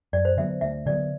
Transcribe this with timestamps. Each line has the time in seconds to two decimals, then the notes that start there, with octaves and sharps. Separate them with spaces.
0.13 F#2 D5
0.25 C5
0.37 D3 F#3 B3 E5
0.61 D2 E5
0.86 D3 F#3 B3 D5